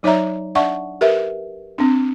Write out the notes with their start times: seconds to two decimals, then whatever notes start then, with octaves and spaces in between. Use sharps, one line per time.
0.03 F#3 D#4 C#5 D5 E5 A#5
0.55 D4 D5 E5 F#5 A5 C#6
1.01 G4 A#4 B4 E5
1.78 C4 D4